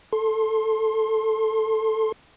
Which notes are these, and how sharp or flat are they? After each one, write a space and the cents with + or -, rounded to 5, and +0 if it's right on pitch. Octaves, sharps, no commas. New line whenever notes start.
A4 +0 C6 +25